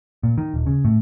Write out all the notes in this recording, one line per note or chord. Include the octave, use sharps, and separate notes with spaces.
A#2
D#3
D#1
C#3
A2